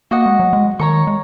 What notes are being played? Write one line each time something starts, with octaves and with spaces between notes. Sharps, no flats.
A#3 F#4 D#5 F#5
G#3
F#3
G#3
D#3 C#5 A#5 C#6
G#3